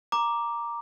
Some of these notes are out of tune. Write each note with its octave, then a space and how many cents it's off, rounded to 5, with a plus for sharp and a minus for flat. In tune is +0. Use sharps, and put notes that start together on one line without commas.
A#5 +5 D6 +0